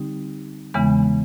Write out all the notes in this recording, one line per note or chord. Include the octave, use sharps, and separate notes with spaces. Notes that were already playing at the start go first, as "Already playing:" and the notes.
Already playing: D3 G3 C4 D#4 G4
E2 C#3 E3 G#3 B3